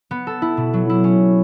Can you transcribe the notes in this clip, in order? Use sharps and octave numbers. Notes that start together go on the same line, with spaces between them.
B3
A4
E4
B2
F#3
E4
C#4